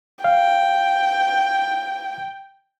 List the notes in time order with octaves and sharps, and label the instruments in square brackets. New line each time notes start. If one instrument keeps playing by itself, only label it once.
[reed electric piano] F5 [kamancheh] G5